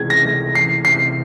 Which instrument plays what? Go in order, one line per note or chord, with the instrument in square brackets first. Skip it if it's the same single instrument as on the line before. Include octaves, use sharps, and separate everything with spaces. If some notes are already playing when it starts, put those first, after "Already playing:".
Already playing: [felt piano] C#2 C3 E3 A3 [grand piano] G#6
[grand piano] A#6
[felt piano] A3
[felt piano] E3 [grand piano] C7
[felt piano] C3 [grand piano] C7